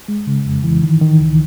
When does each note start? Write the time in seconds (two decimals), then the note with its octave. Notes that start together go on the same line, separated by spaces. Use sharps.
0.08 G#3
0.27 C#3
0.46 F2
0.64 E3
0.83 D#3
1.02 D#3
1.20 C#2